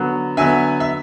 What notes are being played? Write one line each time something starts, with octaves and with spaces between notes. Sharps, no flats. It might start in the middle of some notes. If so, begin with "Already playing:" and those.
Already playing: D3 F#3 B3
D3 F#3 B3 E5 G#5
E5